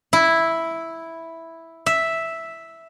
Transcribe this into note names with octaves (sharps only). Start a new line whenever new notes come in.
E4
E5